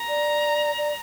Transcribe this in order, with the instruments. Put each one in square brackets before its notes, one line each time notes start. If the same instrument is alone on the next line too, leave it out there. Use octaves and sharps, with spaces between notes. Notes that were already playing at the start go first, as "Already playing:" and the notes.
Already playing: [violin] A#5
[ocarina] D5
D5